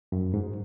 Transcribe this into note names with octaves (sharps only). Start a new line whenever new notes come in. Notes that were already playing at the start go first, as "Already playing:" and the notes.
F#2
G#2